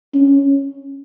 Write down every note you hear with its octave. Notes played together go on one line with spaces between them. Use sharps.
C#4